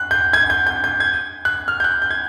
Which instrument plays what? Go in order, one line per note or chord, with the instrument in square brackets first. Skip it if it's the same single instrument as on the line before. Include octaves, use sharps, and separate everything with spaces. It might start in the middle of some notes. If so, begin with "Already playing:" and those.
Already playing: [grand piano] F#6
G6
G#6
G6
G6
G6
G#6
F#6
F6
G6
F#6
G6
G#6